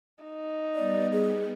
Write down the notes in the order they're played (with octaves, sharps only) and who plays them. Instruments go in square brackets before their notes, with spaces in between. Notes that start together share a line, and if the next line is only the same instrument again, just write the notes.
[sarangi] D#4
[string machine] G3 B3 [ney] D5
[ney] G#4